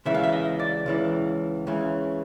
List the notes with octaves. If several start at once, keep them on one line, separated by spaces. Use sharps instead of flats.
C#2 C#3 E3 E5
F5
E5
D#5
D5
C#2 C#3 E3
C#2 C#3 E3